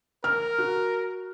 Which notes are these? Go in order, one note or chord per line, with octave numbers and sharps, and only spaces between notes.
A#4 F6
F#4